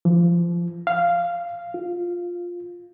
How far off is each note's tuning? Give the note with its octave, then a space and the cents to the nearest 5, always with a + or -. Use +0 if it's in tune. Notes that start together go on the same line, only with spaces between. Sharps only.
F3 -20
F5 -10
F4 +10